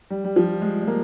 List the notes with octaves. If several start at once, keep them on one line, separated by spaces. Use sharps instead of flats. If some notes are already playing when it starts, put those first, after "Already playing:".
G3
G3
F3
G#3
G#3
A#3